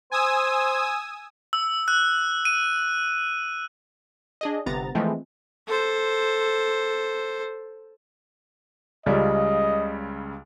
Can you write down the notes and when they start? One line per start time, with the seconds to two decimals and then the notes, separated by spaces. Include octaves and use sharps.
0.11 C5 G#5 D#6 E6
1.53 E6
1.88 F#6
2.45 D#7
4.41 D4 G#4 D#5
4.66 G1 C3 B3 A#5 A6
4.95 E3 F3 G#3 A3 C4
5.67 A4 C5
9.06 C#2 C#3 G3 D#5